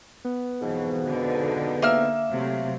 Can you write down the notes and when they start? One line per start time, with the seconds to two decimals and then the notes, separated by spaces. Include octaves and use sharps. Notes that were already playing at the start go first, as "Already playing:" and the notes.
0.25 B3
0.61 F2 G#2 B2 E3 F#3
1.06 D3 D#4
1.82 A#3 E5 F6
2.31 C3 F#3 A3